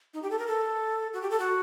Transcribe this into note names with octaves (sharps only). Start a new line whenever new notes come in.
D#4
G4
A4
A#4
A4
F#4
G4
A4
F#4